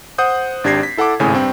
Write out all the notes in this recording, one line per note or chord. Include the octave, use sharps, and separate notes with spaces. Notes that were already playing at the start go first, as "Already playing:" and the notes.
C5 F#5 D#6 G6
G#1 D4 G4 G#6 A#6 C7
B6
E4 A4 F#5 A5 D6
G#1 A2 C#3 G#5
G2 C4 G5